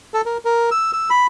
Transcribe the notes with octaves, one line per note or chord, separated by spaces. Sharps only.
A4
A#4
A#4
E6
E6
B5